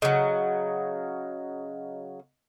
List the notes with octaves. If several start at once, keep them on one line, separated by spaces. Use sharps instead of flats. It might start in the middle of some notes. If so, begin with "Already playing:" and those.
C#3 F#3 D#5